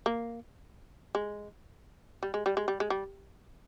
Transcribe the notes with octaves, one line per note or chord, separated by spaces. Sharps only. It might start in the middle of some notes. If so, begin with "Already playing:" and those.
A#3
G#3
G3
G#3
G3
G#3
G3
G#3
G3